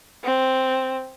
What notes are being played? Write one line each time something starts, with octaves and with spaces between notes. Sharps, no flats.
C4